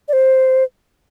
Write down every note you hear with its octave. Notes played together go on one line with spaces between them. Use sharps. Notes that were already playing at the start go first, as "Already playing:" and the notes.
D5
C5